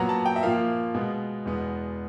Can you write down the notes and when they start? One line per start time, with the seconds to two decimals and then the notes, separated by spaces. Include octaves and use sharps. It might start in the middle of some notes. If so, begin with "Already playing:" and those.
Already playing: A#2 F#3 B3 A#5
0.09 A5
0.26 G5
0.36 E5
0.43 A#2 F3 A#3 F5
0.94 B2 G#3 B3
1.45 E2 B2 G#3 B3